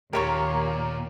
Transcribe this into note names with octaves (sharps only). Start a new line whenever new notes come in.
D#2 A#2 G4 A#4 C#5 A#5 C#6